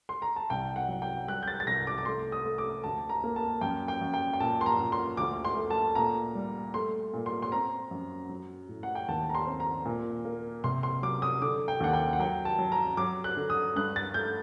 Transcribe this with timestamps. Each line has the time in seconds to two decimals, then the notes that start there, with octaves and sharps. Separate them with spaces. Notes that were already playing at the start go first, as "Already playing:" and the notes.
0.09 C6
0.22 A#5
0.36 A5
0.50 C2 G5
0.76 F#5
0.88 F#3
1.02 G5
1.28 G3 F#6
1.43 G6
1.48 A6
1.60 A6
1.67 C2 A#6
1.87 D6
1.98 D6
2.05 A3 C6
2.32 D#6
2.46 A3
2.58 D6
2.84 D2 A5
3.09 A#5
3.24 A#3
3.36 A5
3.61 F#2 G5
3.88 G5
4.01 F#2
4.14 G5
4.33 G5
4.40 A#2 A5
4.61 C6
4.66 A#5
4.79 A#2
4.92 C6
5.17 D2 D6
5.45 C6
5.56 A3
5.70 A5
5.95 A#2 A#5
6.35 G3
6.74 A3 C6
7.13 A#2
7.26 C6
7.42 C6
7.52 C4 A#5
7.91 F#2
8.29 F#3
8.69 A2
8.83 F#5
8.95 G5
9.08 D#2 A5
9.29 A#5
9.35 C6
9.47 C4
9.60 A#5
9.85 A#2
10.25 A#3
10.64 C3 C6
10.83 C6
11.02 F#3 D6
11.22 D#6
11.42 D3 D6
11.68 G5
11.80 D#2 F#5
11.93 G5
12.13 F#5
12.19 F#3 G5
12.45 A5
12.59 F#3
12.72 A#5
12.97 F#3 D6
13.24 F#6
13.37 D3
13.50 D#6
13.76 G2 F#6
13.96 A6
14.14 A3 G6